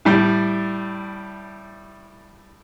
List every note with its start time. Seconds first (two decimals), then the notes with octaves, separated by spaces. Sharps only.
0.05 A2 G3